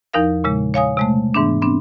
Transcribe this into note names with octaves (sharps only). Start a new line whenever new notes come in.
E2 F3 D#4 A#4 F5
A#2 C#3 G#3
C#5 F5 G#5 D#6
C3 G#3 A3
G#2 E3 B3 D4
B3 C4 D4